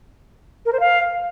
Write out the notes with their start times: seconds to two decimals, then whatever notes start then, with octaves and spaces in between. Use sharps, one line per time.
0.65 A#4
0.73 C5
0.80 F5